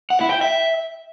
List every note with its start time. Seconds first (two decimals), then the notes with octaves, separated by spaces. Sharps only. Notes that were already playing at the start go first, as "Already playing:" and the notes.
0.10 F#5
0.21 E4
0.31 G5
0.41 E5